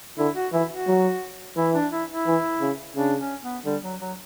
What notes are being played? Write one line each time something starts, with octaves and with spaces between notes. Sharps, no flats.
D3 E4
F#4
E3 E4
F#4
F#3
E3 E4
D4
E4
E4
E3
C#3
C#3 D4
C#4
B3
D3 G3
F#3
F#3